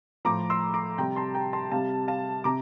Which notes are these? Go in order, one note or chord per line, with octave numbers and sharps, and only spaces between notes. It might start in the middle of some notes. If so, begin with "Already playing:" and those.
A2 F3 A#5 D6
C6 E6
A#5 D6
C3 G3 G5 A#5
A5 C6
G5 A#5
A5 C6
C3 G3 F5 A5
F5 A5
C3 A#5 D6